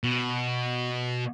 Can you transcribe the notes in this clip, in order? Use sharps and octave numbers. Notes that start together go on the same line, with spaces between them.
B2